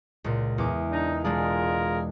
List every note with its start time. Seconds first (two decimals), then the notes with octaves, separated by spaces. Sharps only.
0.24 C#2 A#2
0.58 E2 D6
0.92 D4 D#4
1.25 E1 G#3 D4 F4 G#4 A#4